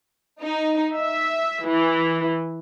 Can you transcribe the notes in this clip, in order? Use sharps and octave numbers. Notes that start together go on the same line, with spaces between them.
D#4
E5
E3